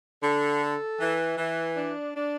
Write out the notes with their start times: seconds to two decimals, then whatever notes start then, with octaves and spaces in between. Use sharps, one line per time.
0.23 D3
0.62 A4
1.00 E3
1.38 E3
1.76 D4
2.15 D4